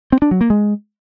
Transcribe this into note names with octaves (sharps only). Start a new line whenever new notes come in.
C4
D4
F#3
A#3
G#3